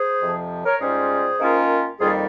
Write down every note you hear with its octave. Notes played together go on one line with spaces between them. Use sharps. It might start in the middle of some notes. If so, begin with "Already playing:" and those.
Already playing: G#4 C5
F2 C3 F3
A#4 C#5
G#2 G3 C#4 F4 G#4 C5
D#3 A#3 C#4 F4
F2 D#3 G3 A#3 F4 G#4